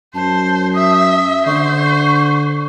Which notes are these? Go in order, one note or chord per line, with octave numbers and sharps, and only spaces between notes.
F#2 C5 A5
E5 D#6
D3 C5 C#6